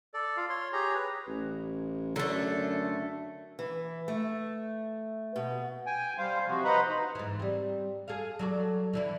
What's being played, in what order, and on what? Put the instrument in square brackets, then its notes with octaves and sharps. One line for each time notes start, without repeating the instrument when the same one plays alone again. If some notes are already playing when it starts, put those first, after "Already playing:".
[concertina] A4 D5
F4 F5
C#5 C6
G4 G#4 C#5 A#5
B4
[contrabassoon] A1
[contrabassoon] F#2 [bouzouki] D3 A3
[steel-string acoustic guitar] E3
A3
B2
[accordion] G5 G#5
G3 C5 F5
C3 F3 F#4
B4 C5 D#5 F#5 A#5 B5
D#4
[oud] G#2 E3
G3 C4
G#4 A4 F5
F#3 A4 D5
D3 E3 E4